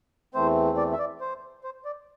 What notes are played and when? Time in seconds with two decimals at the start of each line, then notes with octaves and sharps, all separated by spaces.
0.35 E2 E3 A3 C4 C5
0.77 D5
0.92 E5
0.99 D5
1.21 C5
1.64 C5
1.85 D5